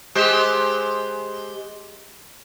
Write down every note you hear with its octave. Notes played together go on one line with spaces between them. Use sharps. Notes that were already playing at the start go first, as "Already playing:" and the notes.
G#3 G4 C5